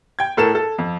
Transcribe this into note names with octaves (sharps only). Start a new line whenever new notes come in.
G5 G#6
A2 A4 A#4 E7
A4
F2